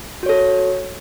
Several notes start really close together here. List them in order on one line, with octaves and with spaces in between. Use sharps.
F#4 C#5 A4